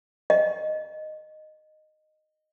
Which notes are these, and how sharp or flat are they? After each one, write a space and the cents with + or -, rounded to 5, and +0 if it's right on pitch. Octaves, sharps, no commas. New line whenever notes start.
D#5 -10